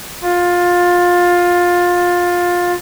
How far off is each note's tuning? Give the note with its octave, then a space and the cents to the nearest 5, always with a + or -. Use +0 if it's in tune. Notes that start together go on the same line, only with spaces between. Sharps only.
F4 +20